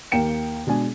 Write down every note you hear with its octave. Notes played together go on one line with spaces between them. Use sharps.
D#2 A#3 G5 C#7 E7
B2 G#3 D4 G#5